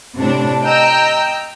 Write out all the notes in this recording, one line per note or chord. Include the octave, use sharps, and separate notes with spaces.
A2 C3 D4
D#5 G5 A#5 E6 G6